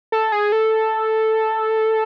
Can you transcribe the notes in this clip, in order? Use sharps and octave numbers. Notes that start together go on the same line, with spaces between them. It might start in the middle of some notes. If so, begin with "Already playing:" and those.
A4
G#4
A4